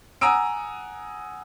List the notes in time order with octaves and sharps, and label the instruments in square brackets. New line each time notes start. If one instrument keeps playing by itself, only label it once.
[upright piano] F#5 G#5 A#5 D#6 E6 D7